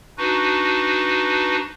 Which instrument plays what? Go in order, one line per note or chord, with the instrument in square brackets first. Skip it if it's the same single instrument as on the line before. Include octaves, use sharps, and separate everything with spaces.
[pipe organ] D4 D#4 F#4 B4